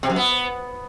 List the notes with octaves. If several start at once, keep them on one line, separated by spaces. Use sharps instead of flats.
C3
F#2
B3